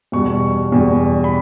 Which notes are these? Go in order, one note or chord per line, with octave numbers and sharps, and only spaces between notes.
E2 B2 G3 C#6
E2 B2 G3
B5